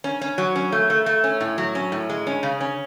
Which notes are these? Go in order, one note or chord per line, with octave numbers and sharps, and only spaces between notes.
C#4
C#4
F#3
C#4
A3
A3
A3
C#4
A2
F#3
C#4
A2
G#3
C#4
C#3
C#4